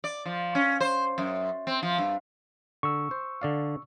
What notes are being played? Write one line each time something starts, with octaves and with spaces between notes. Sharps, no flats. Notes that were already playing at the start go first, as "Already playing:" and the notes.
D5
F3
C#4
C5
F#2
C4
F3
G2
D3 C#6 E6
C5
D3 D5 F5